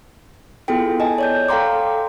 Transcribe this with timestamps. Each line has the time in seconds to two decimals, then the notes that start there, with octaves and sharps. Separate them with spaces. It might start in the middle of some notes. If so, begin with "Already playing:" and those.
0.68 B3 E4 F4 G#4 A4 G5
1.00 D#5 G#5 A5
1.18 C#5 D5 G6
1.49 A4 F5 G5 A#5 C6 D6